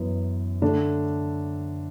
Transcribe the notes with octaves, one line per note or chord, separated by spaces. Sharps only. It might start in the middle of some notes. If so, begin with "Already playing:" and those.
Already playing: F#2 E3 B3
D3 A3 D4